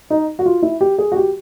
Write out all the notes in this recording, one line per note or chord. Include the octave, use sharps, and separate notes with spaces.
D#4
F#4
F4
E4
G4
G#4
F#4
G4